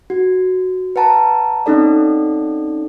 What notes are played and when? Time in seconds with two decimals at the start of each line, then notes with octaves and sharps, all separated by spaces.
0.10 F#4
0.96 B4 F#5 A5 A#5
1.66 C4 C#4 D#4 A4 D5